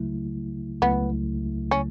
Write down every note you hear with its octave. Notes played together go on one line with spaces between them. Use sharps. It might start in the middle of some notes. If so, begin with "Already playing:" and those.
Already playing: C#2 C#3 F#3 A3 E4
C#2 C#3 F#3 A3 B3 E4
C#3 F#3 A3 C#4